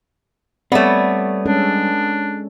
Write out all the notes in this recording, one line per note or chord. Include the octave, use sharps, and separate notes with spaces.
G3 A3 B3 C4 C#5 D5
G#3 C#4 D4 A4